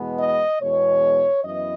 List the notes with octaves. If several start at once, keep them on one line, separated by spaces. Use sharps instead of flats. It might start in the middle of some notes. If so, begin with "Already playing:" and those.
Already playing: E2 B2 G#3 B3
D#5
E2 B2 G#3 C#5
F#2 E3 B3 E4 D#5